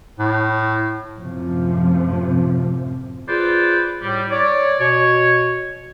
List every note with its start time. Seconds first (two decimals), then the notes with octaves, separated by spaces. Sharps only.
0.19 A2
1.19 F#2 A2 C3 F3
3.28 F4 G#4 B4 C5 D5
4.02 A2 G3
4.31 C#5 D5
4.80 B2 C#5